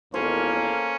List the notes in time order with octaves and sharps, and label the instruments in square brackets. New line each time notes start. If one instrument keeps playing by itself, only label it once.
[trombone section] G#1 E2 [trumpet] A#3 [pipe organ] C#4 [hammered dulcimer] A4 C5